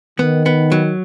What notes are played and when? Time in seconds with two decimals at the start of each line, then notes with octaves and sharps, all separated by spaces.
0.19 D#3 B3
0.46 B3
0.72 F#3